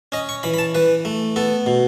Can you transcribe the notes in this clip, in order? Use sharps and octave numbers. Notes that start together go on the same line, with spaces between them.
C#4 D#5
C#6
E3 B5
B5
A5
E3 B4
A3
B3 A4
B2